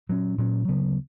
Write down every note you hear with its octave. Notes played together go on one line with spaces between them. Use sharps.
A#2 F#3 C#4
A#2 F#3 C#4
D2 C#3 F#3 B3